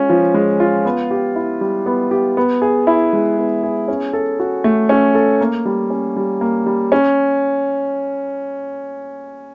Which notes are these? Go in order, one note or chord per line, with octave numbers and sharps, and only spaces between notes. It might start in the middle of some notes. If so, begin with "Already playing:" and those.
Already playing: G#3 C#4 F4
F3
G#3
F4
B3
G4
E4
G3
B3
G4
B3
G#4
E4
G#3
B3
G#4
C#4
A4
F#4
A3
C#4
A4
A#3
G3
C#4
G3
A#3
G3
C#4